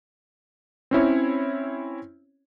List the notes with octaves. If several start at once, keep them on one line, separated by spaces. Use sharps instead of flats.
C4 C#4 E4 C#5